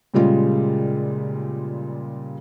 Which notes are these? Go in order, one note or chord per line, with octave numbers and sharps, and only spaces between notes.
A#2 C#3 G3 G#3 F4